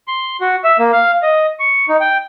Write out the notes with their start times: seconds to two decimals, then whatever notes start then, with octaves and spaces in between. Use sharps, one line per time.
0.08 C6
0.41 F#4
0.64 E5
0.79 A#3
0.92 F5
1.23 D#5
1.60 C#6
1.88 D#4
2.00 G5